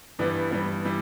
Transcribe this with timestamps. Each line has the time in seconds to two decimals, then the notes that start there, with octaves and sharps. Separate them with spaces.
0.19 G2 E3 G3 B3
0.51 G2 E3 G3 B3
0.85 E3 G3